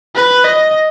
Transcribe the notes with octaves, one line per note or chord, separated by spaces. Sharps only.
B4
D#5